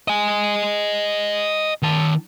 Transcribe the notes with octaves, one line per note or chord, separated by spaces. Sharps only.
D#5 G#5
D#3 A5